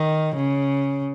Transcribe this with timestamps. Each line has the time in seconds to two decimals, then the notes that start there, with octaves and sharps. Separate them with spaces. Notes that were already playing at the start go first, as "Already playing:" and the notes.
Already playing: D#3
0.36 C#3